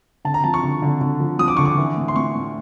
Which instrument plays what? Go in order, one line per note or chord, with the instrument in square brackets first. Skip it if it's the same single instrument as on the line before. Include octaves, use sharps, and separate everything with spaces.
[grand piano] D3 A5
A#5
F3 A5
C#6
D3
D3
D3
F3
F3 D#6
D6
D3 C#6
D6
E3
A2
C6
A2 C#6
A2